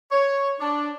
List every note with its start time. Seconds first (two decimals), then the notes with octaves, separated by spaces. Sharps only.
0.11 C#5
0.60 D4